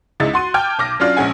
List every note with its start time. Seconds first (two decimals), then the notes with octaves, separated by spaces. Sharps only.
0.20 C#2 G#3 D#4 E4 A6
0.33 F#4 C6 D#7
0.54 G5 A5 D6 F6 G6 G#6
0.79 B1 A5 D6 F6 A#6
1.00 F#3 C#4 D4 F4 D5
1.17 A#1 G#3 C#4 G#4 F#5 G#5